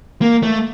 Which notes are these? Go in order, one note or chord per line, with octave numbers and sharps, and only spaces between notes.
A#3
A3